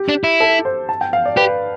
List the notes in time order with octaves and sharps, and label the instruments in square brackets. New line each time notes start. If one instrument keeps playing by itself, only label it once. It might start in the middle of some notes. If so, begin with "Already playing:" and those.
Already playing: [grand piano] G4
[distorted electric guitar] D4
E4
[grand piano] A4
C5
A5
G5
F5
D5
[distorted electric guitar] G4 [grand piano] B4